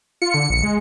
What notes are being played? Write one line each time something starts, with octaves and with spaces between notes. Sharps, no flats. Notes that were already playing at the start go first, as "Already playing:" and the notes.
F4 C#7
D3
A#1
G#3